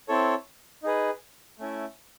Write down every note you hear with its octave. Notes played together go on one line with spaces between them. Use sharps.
C4 E4 A4 C#5
D#4 G#4 B4
A3 C#4 E4